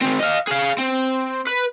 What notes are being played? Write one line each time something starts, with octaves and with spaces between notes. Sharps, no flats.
D#3 C4
D#5 F5
G#4 F5
C4
B4